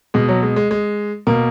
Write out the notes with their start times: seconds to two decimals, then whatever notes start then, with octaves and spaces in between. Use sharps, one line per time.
0.14 B2 G#3
0.29 F#3
0.42 G#3
0.56 G#3
0.71 G#3
1.27 B2 A#3